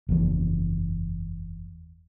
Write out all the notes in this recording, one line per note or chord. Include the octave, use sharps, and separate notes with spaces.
F#1 E2